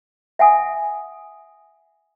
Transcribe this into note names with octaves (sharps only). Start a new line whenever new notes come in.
E5 F#5 G#5 D#6